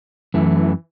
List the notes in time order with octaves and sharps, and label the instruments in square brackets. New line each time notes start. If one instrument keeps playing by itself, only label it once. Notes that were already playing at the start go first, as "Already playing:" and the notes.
[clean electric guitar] F#2 A3 [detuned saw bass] E3